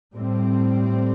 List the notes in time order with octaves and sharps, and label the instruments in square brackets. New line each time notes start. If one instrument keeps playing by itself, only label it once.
[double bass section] A2 G3 C4